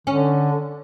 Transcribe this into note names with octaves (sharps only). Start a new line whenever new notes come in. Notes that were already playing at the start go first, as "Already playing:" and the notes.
D3 C#4